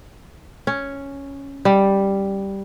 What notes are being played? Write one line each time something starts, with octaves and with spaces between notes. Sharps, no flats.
C#4
G3